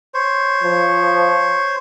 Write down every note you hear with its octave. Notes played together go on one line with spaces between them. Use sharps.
C5 C#5
F3